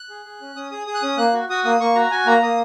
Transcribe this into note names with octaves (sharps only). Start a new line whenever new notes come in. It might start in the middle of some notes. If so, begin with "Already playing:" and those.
Already playing: F#6
G#4
G#4
C#4
C#4 D#6
G#4 D#6
G#4 D#6
F#6
C#4 D#6
A#3 F#6
F#4
F#4 D#6
A#3 D#6
A#3 C#6
F#4 A#5
F#4 G#5
A#3 A#5
A#3 D#6